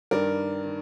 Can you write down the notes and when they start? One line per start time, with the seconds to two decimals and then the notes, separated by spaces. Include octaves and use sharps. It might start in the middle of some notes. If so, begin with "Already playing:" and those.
0.11 G2 D#3 G3 A#4 D5
0.66 D#3